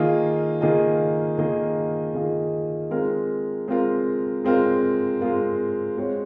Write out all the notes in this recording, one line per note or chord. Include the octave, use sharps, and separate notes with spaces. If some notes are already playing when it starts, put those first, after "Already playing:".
Already playing: D#3 A#3 F4 G#4 D#5
D#3 A#3 F4 G#4 D#5
D#3 A#3 F4 G#4 D#5
D#3 A#3 F4 G#4 D#5
G#3 C4 F4 A#4
G#3 C4 F4 A#4
G#3 C4 F4 A#4
G#3 C4 F4 A#4
G#3 C4 F#4 C#5